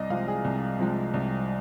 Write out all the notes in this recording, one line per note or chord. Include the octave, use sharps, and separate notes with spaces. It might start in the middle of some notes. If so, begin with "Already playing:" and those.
Already playing: C2 D5 D#5
C3 F3 G#3 F5
G#4
C2
C3 F3 G#3
C2